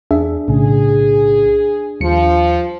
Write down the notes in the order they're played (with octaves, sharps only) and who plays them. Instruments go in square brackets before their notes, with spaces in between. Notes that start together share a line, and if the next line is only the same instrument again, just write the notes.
[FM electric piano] E2 G#4 E5 [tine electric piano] D4
[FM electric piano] B1 A2 C#3 [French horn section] G#4
[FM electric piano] D#2 G3 C#7 [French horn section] F3